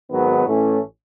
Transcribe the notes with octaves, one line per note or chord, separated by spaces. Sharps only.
G#1 G#2 D#3 F#3 B3
A1 A2 E3 A3 C#4